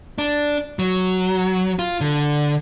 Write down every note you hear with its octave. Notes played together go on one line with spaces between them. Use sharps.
D4
F#3
F4
D3